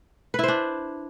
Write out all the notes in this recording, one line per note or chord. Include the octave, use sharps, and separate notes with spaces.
D4 E4 B4 C5